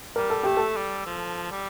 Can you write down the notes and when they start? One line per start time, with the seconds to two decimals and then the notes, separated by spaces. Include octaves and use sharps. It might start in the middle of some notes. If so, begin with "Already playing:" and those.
0.16 G3 A#4
0.30 A4
0.43 A3 G4
0.57 A4
0.76 G3
1.06 F3
1.51 G3